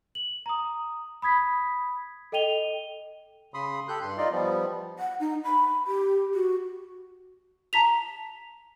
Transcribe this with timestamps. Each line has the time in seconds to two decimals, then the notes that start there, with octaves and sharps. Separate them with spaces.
0.15 F#7
0.46 A#5 D#6
1.22 B5 D#6 G#6 B6
2.32 A4 D#5 G5 D#7 F7 G7
3.54 C#3 B5 C6 D#6
3.88 G4 A4 F#6 G6
4.02 G2 C6
4.18 D#4 F4 D5 D#5
4.32 F3 G3 B3
4.99 F#5
5.20 D#4
5.44 B5
5.87 G4
6.34 F#4
7.73 A5 A#5 B6 F7